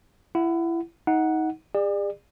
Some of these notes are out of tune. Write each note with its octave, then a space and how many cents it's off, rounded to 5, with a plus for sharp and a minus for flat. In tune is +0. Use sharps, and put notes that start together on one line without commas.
E4 +25 F#5 +0
D#4 +25 F#5 +0
G#4 -45 D5 +25